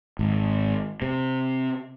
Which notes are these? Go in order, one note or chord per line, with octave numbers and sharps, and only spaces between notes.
G#1
C3